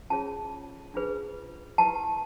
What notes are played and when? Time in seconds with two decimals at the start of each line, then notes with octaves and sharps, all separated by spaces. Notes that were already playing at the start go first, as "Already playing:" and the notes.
0.10 C#4 F4 G#4 C#5 A5
0.94 D4 F4 G#4 B4
1.78 E4 G4 B4 A5